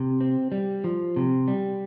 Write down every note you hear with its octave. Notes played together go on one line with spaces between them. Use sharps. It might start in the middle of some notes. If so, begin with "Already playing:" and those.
Already playing: C3
C4
G3
F3
C3
G3